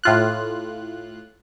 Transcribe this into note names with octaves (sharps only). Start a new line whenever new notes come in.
A2 F4 F#6